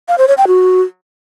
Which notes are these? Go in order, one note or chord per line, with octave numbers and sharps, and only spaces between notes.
F5
C5
C#5
G5
F#4